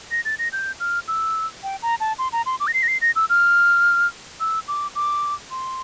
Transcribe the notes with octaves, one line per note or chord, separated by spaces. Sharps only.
A#6
A6
A#6
G6
F6
E6
G5
A#5
A5
C6
A#5
C6
D6
A#6
C7
A#6
C7
A#6
E6
F6
E6
D6
D6
C6